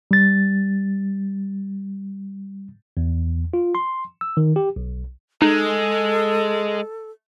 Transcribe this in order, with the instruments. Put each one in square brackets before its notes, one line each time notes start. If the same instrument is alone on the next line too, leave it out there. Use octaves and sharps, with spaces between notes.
[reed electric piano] G3 A6
[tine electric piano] E2
F4
C6
E6
D#3
G4
B1
[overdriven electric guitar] G#3 [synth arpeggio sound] D#4 [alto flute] A4